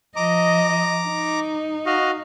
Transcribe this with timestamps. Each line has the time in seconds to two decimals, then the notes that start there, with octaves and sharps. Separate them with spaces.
0.16 F3 D#5 A#5 D6
1.07 D#4
1.86 F#4 D#5 F5